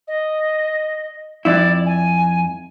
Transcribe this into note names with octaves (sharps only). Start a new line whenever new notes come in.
D#5
F2 E4 D5
G#5